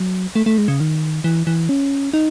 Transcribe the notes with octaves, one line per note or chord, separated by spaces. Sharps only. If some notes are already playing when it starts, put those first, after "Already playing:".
Already playing: F#3
A3
A3
G#3
C#3
D#3
E3
E3
C#4
D#4